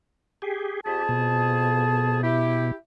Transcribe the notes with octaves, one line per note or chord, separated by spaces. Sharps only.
G4 G#4
F2 G4 G#4 A5
B2
E4 G4